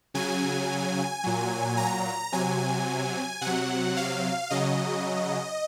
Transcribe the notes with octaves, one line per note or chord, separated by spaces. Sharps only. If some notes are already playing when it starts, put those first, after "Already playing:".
C#3 F#3 G#5
A#2 F#3
A#5
C3 F#3 G#5
C3 F#5
F#3
F5
C#3 F#3 D#5